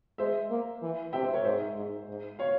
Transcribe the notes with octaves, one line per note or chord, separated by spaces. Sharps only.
G#3 C5 E5
A#3
E3
C3 E5 G5
C5 E5
A#4 C#5
G#2 C5 E5
G#2
G#2
C#5 F5